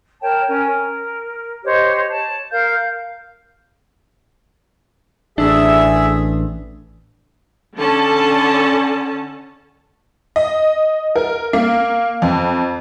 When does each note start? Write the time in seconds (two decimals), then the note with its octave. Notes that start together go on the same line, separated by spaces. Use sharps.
0.21 A#4 C#5 G5 A5
0.48 C#4 A#4 G#5
0.67 A#4
1.65 G4 C5 C#5 D#5
2.11 C#5 A5
2.52 A#4 F5 G6
5.38 A1 D4 G#4 E5
7.76 D3 C#4 A5
10.36 D#5
11.16 A#4
11.53 A#3
12.22 F2